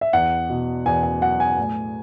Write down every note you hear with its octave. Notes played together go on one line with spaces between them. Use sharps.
E5
E2 F#5
B2
E2 G#5
G#5
F#3 F#5
G#5
A2